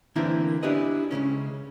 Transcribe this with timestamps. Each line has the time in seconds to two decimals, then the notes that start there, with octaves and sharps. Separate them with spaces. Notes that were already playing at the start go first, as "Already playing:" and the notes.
0.16 D3 E3 A#3 C4 E4 A#4
0.63 D4 E4 G4 G#4 B4 D#5
1.11 C#2 G#2 C#3 C#4